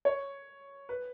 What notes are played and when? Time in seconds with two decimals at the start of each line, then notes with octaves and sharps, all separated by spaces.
0.05 C#5
0.89 B4